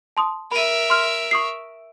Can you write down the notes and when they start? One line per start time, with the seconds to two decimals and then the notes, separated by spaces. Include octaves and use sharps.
0.17 A5 C6 D#6
0.51 A#4 E5 B5 D#7
0.90 C6 F6
1.31 C#6 D#6 C7